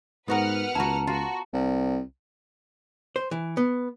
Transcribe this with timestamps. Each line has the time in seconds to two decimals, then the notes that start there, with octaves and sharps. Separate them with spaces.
0.28 G#2 B3 F#4 A#4 B4 F#5 F6
0.75 C#2 E4 F#4 A5 A#5
1.07 F4 F#4
1.53 C2
3.16 C5
3.31 E3
3.57 B3